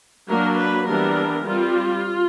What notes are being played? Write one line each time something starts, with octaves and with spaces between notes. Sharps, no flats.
F#3 A#3 D4 A#4
B4
E3 G3 B3 D4 A#4
G3 C4 F4